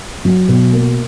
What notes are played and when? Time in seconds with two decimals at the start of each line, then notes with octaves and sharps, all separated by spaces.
0.25 F#3
0.48 B2
0.72 A#3